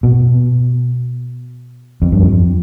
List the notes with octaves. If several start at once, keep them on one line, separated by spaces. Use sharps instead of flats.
B2
F2
G2
F2